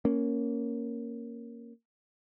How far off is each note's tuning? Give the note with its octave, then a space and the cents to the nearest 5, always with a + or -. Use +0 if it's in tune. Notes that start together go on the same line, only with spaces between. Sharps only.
A#3 +0 C#4 +0